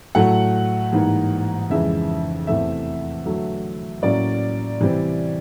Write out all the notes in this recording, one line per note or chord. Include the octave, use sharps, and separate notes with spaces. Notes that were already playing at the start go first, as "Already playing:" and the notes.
A2 F#3 A3 F#5
G#2 E3 G3 A#3
F2 C#3 E3 G#3 E5
E2 C3 E3 A3 E5
D3 F#3 A3
A2 F#3 A#3 C#4 D5
C3 E3 G3 C4